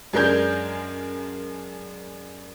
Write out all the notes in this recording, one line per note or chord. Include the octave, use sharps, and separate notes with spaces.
F#2 G#3 D4 A#4 G6 G#6